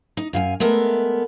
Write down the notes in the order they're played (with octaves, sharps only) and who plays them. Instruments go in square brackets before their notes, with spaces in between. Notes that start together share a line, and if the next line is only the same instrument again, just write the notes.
[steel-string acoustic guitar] D#4
F#2 F5 G#5
G#3 A3 B3 A#4